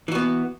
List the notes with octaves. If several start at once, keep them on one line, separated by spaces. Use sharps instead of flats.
E3 B3 F#4